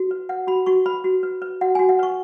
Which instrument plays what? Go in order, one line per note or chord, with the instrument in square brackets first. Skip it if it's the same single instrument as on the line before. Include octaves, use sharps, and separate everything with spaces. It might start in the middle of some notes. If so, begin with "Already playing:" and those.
Already playing: [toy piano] F#4
B4
B4 F#5
F#4 B5
F#4 C#6
B4 B5
F#4
B4
B4
F#4 F#5
F#4 G#5
F#5
B4 C#6